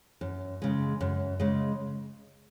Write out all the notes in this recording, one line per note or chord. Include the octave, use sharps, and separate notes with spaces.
F#2
C#3 G#3
F#2
C#3 G#3